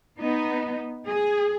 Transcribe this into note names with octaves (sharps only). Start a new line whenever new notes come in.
B3 D#4
G#4